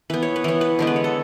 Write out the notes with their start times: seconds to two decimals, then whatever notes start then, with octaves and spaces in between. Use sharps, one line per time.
0.10 E3 B3 B4
0.22 C#5
0.36 B4
0.44 E3 B3 C#5
0.61 B4
0.79 D3 G#3 B3
0.87 B4
0.96 C#5
1.04 A4